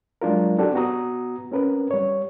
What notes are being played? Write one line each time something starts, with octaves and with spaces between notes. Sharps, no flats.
F#3 G#3 D4 F4 A#4
C4 D4 F#4 G4 A4
B3 F#4 A#5 D#6
C4 C#4 A#4 B4
G3 C#5